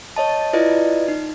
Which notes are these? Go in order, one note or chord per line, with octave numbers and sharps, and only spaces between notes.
C#5 D#5 A5
E4 F4 B4 D5 D#5
D#4